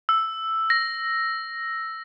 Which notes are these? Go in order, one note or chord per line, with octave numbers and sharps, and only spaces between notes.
E6
A#6